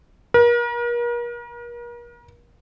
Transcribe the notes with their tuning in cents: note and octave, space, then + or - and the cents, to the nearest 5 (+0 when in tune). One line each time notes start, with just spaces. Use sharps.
A#4 +40